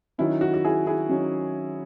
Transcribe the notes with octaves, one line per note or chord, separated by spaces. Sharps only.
D#3 F#3 C#4 E4
F#4
F#4
E4 G#4
E4 G#4
D#3 F#3 C#4